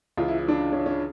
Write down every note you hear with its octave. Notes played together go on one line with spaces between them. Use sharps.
C#2 C#3 E3 F4
E4
E4
D4
C#4
C#4